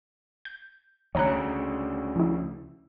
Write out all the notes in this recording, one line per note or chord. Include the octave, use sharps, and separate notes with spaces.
G6
D2 C#3 C#5 A#5 F#6
F3 E4